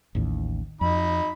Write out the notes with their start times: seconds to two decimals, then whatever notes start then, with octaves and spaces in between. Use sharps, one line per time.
0.15 A1 D#2 A2
0.81 F2 D#4 B5